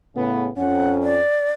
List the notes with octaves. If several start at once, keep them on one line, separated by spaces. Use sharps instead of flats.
A2 C#3 B3
F2 C#4 F#5
D5